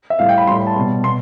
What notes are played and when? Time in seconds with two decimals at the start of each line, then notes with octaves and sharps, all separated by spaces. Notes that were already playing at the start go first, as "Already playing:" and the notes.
0.10 E5
0.19 A2 G3 F5
0.29 G5
0.38 B5
0.47 A2 G3 C6
0.57 B5
0.67 A5
0.76 B2 G3
1.04 B2 C6